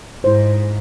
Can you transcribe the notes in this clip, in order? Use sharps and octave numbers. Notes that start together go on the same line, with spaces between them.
G#2 E4 C5